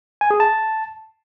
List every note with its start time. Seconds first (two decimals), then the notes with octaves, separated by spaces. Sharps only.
0.21 G#5
0.31 G#4
0.40 A5